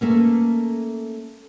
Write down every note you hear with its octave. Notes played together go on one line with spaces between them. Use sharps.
A3 A#3 C#4